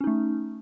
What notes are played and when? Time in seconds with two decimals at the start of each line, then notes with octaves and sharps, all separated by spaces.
0.01 C#4
0.04 D#4
0.07 A3